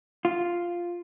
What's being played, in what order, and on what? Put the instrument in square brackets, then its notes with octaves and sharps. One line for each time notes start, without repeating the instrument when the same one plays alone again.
[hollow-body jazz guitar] F4